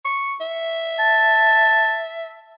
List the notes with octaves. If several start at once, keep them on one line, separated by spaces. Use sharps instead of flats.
C#6
E5
A5